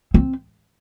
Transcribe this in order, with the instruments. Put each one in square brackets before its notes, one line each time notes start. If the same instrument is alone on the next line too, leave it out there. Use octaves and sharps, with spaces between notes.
[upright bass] C4